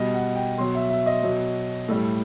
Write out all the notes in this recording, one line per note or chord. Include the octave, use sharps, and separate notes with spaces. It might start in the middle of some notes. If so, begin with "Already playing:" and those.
Already playing: B2 G3 D#5
F#5
G5
B2 F#3 C6
E5
E5
D#5
B2 F#3
A2 G3 A4